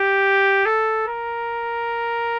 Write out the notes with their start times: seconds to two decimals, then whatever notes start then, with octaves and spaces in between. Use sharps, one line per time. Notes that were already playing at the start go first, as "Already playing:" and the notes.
Already playing: G4
0.65 A4
1.08 A#4